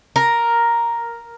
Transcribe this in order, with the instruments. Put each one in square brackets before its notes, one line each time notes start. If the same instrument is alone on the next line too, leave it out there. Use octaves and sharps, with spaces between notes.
[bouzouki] A#4